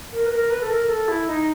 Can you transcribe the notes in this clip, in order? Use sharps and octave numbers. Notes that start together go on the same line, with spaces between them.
A#4
B4
A#4
B4
A4
A#4
A4
E4
D#4